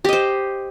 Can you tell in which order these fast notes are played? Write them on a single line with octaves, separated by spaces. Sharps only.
G4 D#5 C5